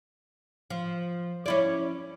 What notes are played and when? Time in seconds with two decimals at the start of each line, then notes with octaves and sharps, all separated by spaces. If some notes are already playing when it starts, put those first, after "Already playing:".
0.70 F3
1.46 C#4 E4 D5